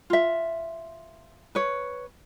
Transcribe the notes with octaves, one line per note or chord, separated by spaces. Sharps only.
F4 E5
B4 C#5